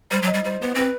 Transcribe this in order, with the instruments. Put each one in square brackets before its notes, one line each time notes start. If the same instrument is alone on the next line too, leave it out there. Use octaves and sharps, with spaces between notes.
[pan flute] G3 [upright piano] C5
[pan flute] F#3
[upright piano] D#5
[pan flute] G3
[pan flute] G3 [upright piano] C5
[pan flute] B3 [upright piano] B4
[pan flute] C4 [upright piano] B4